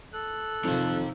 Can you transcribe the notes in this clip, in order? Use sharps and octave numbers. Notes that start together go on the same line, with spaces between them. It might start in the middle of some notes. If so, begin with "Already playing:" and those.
A4 F#6
F2 C3 D#3 F3 D#4 F5